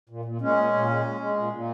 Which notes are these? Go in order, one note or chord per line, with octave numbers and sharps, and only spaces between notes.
A#2
A#2
A#2 G#3 C#4
A#2
A#2
G#3
G#3
G#3
A#2
A#2